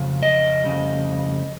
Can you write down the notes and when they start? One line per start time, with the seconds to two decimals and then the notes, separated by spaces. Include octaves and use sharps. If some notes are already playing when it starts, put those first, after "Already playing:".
Already playing: F2 C#3
0.23 D#5
0.64 F2 C#3 G3